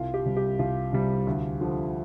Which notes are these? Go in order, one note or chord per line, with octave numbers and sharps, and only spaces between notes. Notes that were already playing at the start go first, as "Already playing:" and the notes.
Already playing: C2 F4
G4
C3 G3
G4
C2 F4
C3 G3
D2
D3 F3